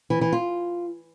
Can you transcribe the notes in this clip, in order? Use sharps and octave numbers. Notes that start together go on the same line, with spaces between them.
E3
E3
F4